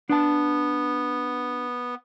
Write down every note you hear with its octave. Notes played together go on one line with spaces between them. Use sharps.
B3 D4 A5